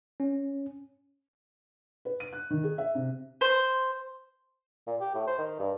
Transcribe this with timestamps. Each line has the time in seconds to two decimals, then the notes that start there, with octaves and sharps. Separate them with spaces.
0.20 C#4
2.05 B4
2.20 D#7
2.33 F#6
2.50 D#3
2.64 G#4
2.78 E5
2.95 C3
3.41 C5
4.87 A#2
5.01 G4
5.15 A2
5.27 C5
5.38 D#3
5.59 G2